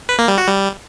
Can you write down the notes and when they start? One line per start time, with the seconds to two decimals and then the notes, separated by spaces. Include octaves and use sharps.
0.09 B4
0.18 A#3
0.28 G3
0.38 F#4
0.48 G3